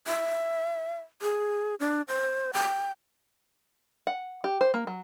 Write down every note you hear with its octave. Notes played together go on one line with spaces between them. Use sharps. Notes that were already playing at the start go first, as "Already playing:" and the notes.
E5
G#4
D4
C5
G5
F#5
G4
C5
A#3
F#3